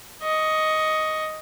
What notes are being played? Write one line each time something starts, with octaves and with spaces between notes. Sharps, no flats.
D#5 C#6